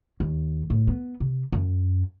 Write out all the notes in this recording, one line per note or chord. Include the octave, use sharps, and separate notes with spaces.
D#2
A2
B3
C3
F#2